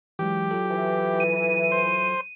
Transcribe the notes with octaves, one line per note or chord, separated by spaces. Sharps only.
E3 F#3 G#3 G4
F#3 F4 A4
E3
D#7
C5